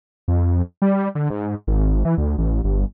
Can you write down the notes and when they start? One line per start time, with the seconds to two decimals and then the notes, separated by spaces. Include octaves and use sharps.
0.28 F2
0.82 G3
1.15 D3
1.30 G#2
1.67 G#1
2.05 E3
2.18 D2
2.38 A1
2.64 G1